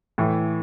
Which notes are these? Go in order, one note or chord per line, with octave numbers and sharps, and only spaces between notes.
A2 E3